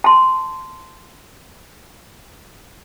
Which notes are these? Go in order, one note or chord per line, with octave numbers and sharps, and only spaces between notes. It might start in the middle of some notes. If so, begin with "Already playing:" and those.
A5 C6